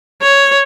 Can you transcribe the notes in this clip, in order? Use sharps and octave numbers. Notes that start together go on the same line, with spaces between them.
C#5